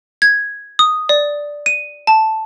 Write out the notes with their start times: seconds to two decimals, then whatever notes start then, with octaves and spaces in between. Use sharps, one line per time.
0.22 G#6
0.79 D#6
1.09 D5
1.66 D#7
2.07 A5